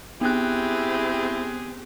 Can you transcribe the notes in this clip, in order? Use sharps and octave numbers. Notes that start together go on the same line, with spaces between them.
B3 C4 E4 G4 G#4 F#6